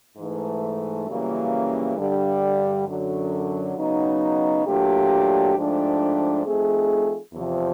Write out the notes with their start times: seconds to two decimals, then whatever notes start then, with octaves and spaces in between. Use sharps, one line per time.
0.17 G#2 E3 A3
1.06 F#2 C#3 E3 G3 A#3
1.96 G2 D3 G3
2.86 F#2 D3 F#3
3.76 C#3 F#3 B3 D#4
4.65 A#2 F#3 A3 D4 G4
5.55 G#2 F3 A3 D4 G4
6.44 F3 A3 C4 D#4 G#4
7.34 E2 C3 F3